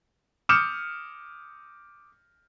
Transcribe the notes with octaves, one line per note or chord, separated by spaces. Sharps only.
D6 D#6 F6 G6 C#7 E7